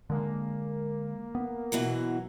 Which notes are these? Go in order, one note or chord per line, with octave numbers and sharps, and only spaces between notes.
D3 G#3 A#3
B3
B2 E3 F#3